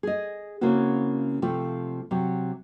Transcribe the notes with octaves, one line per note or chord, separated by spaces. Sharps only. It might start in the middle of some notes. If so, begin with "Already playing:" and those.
G#4 D#5
C#3 A#3 C4 C#4 E4 F#4
C3 F3 A3 F4
C3 F#3